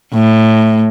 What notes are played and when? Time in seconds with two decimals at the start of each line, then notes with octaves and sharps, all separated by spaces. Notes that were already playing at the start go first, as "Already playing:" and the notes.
0.13 A2